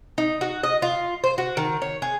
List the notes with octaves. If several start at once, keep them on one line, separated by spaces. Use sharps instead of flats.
D#4
F#4
D#5
F4
C5
F#4
D#3
C#5
G#4